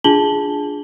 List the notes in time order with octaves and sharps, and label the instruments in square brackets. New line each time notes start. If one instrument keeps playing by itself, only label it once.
[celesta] D4 F4 G#4 A5 F#7 G7